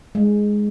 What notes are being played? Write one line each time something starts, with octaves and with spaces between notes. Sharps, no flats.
G#3